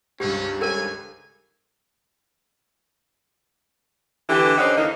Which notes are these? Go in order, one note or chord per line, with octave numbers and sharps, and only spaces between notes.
G#1 C#2 G2 C#4 G4
A4 A#4 C#5 G#5
D3 E3 G4
D3 C#4 D#4 C5 D5 F#5
E2 D3 A#3 D#4